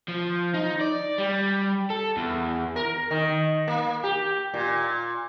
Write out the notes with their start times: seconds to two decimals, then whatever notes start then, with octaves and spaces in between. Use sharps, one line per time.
0.08 F3
0.54 D#4
0.81 D5
1.18 G3
1.90 A4
2.17 E2
2.76 A#4
3.11 D#3
3.68 A#3
4.04 G4
4.54 A#2